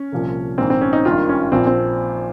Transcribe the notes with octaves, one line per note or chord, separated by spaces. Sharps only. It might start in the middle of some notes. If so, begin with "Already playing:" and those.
Already playing: C#4
C2 A#2 F3
A#1 G#2 D#3 C4
C4
C#4
D#4
G#1 G2 D#3 F4
C#4
A#1 A#2 F3 C4
C4